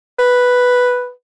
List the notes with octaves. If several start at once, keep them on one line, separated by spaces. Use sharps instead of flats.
B4